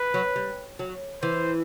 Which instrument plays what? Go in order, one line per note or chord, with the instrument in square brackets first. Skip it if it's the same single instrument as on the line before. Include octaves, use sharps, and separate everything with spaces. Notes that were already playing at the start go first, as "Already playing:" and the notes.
Already playing: [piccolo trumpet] B4
[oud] F#3
G3
F#3
[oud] E3 [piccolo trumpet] C5